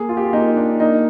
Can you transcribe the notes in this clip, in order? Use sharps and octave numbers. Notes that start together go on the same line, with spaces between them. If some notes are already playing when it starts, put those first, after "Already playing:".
Already playing: A#3 G#4
F4
G4
F4
A#3 D#4
D4
A#3 D#4